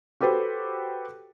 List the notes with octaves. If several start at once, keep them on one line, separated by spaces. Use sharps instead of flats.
F#4 G4 A4 B4 C5